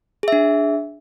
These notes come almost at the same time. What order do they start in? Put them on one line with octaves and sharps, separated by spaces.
G#4 E5 D4